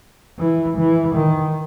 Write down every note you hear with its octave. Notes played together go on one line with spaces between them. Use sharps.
E3
E3
D#3